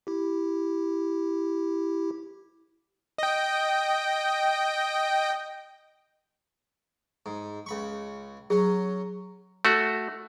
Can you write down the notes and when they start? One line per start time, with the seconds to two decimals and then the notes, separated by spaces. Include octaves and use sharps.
0.07 E4 G4
3.18 D#5 G5
7.26 G#2
7.66 C#2 B5 C#6
8.50 F#3 C#4 G#4
9.65 A3 F#4